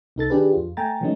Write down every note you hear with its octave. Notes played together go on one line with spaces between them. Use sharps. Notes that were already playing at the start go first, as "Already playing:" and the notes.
C2 D#4 A4 A6
D#3 D4 G4 G#4 B4
F2 F4
A3 G5 G#5 A#5 A6
E3 F#3 G#3 A3 C#4 D#4